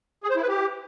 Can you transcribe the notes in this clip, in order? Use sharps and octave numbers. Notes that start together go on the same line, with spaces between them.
G#4
C5
E4
B4
G4